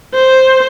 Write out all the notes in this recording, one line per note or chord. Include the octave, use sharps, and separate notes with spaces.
C5